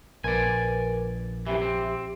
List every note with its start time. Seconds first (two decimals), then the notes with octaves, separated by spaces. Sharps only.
0.24 A#1 A#4 B4 D5 G#5
1.47 F#2 C3 E3 G4 E5
1.62 C4